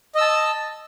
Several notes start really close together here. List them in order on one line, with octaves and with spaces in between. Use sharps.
D#5 E6 A5